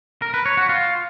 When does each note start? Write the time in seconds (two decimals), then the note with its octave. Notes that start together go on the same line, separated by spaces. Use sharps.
0.22 A#4
0.34 B4
0.46 C#5
0.57 F#4
0.69 F4